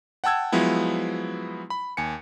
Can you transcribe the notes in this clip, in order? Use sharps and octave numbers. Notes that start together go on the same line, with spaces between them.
F#5 G5 A5 E6 G#6
F3 F#3 G#3 B3 E4
B5
D#2 G#5 C#7